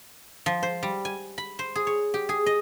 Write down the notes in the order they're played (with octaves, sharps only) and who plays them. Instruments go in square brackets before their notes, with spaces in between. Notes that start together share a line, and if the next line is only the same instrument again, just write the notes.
[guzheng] F3
C5
G3
G#5
B5
C5
G#4
C#5
G4
G#4
D#5